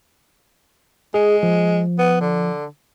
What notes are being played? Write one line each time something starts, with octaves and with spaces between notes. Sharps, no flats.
G#3 G#4
F3
B3
D3